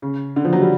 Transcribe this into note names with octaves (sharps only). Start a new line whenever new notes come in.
C#3
D3
F3
F#3
G3